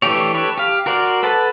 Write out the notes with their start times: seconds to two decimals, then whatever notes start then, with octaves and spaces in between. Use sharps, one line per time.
0.02 E3 A3 D4 G4 C#5
0.34 G4 A4 B4 C#5
0.58 G4 F5
0.86 F#4 A#4 C5 D5
1.23 A4 B4 F#5 A5